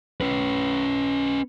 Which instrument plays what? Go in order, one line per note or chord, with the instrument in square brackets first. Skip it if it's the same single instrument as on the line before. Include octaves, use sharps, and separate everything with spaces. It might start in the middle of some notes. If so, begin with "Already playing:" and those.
[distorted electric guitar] C#4 B4